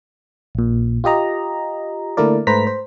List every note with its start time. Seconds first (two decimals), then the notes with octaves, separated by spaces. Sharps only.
0.55 A#1 A#2
1.04 F4 G4 D#5 A#5
2.17 D3 A3 A#3 E4 A#4 D5
2.47 G#2 A3 B4 C5 A#5 B6
2.67 C5